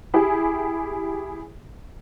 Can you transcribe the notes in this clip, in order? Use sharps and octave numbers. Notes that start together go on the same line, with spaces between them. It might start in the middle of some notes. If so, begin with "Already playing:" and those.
E4 G4 G#4